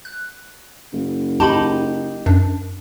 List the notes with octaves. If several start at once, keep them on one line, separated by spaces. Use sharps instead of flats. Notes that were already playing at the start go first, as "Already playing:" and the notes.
F#6
F#1
D#4 G4 A5 B5
F#2 D4